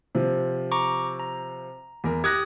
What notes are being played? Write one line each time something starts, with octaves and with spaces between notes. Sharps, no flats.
C3 F3
A#5 C#6 D6
A#5
E2 A#4
G4 D#6 F#6 G#6 A#6